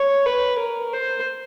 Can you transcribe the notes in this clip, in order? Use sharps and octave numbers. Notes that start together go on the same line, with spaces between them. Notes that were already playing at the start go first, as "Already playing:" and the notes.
Already playing: C#5
B4
A#4
C5